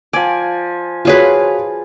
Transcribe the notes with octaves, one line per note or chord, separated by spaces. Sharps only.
F3 D5 G#5
F4 F#4 G#4 B4 C#5